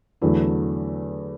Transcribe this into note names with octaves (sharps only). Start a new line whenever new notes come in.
E2 D3 F#3 A3 E4